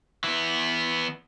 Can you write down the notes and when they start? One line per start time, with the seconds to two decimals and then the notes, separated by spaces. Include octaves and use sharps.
0.24 E3 B3